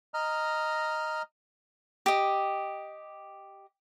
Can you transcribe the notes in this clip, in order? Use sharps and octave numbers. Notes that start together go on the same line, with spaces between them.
D#5 A#5 F6
G4 D#5